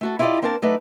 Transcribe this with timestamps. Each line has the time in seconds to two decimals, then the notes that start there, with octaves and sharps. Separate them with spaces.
0.01 A3 F#4 A4
0.19 E4 F4 G4 G#4 D5 D#5
0.42 A#3 C4 D4 A#4 D5 A5
0.62 F#3 A3 D#4 A4 B4 D5